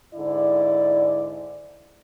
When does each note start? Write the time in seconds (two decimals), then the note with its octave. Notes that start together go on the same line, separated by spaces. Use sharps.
0.14 G#2 D3 E4 D5